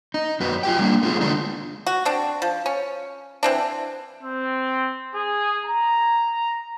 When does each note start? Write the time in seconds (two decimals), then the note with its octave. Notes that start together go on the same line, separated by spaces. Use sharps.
0.14 D#4
0.40 F#2 F#4 B4
0.63 F4 G4 G5
0.79 G3 A#3 D4
1.03 A3 B3 F4 G4 G#4
1.21 D3 G#3 D4 D#4
1.86 F#4
2.05 C4 D4
2.42 F3
2.66 C#4
3.43 E3 C4 D4
4.23 C4
5.15 G#4
5.64 A#5